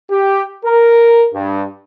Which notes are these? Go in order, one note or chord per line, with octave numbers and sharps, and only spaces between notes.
G4
A#4
G2